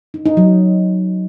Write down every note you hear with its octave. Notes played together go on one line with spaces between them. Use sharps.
D#4
D#4
F#3